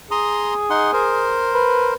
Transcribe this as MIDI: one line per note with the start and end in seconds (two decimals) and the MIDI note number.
0.11 1.41 68
0.11 0.54 82
0.11 0.54 84
0.11 0.54 87
0.70 0.91 63
0.70 0.91 78
0.70 0.91 84
0.93 1.94 70
0.93 1.94 72
1.54 1.93 71